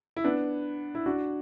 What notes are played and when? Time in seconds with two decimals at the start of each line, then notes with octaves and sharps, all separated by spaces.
0.16 E4
0.24 B3 D4
0.95 E4
1.06 D4 F#4